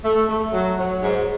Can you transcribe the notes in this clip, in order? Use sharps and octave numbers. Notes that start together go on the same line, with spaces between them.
A3
A3
F#3
F#3
G#2